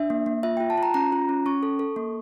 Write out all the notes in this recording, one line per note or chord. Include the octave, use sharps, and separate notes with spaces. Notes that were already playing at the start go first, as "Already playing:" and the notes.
Already playing: D4 E5
A#3
A#3
F4 E5
F4 G5
A5
F4 A#5
C#4 A#5
F4
C#4
C#4 C#6
A4
A4
A#3